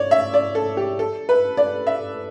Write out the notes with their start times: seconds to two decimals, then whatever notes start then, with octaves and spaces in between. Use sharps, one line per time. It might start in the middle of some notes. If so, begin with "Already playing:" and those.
Already playing: C#5 D5
0.11 E5
0.34 D5
0.55 A4
0.77 G4
0.99 A4
1.29 B4
1.57 D5
1.87 E5